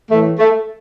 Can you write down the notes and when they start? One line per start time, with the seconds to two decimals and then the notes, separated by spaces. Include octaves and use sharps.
0.10 A2 E3 A3
0.39 A3